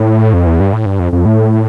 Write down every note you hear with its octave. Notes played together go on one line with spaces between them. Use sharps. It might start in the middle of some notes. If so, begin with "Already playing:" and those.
Already playing: A2
F2
E2
G2
A2
G2
F2
F2
A2